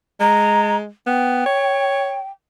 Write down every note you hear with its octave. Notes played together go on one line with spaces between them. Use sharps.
G#3 A#5
B3 G5
C#5